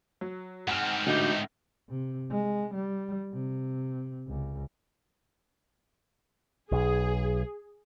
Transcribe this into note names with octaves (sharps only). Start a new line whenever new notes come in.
F#3
G#2 C4 F#5 G#5 F6
D2 A2 D#4 G4
C3
G#3
G3
C3
C#2
B1 G#4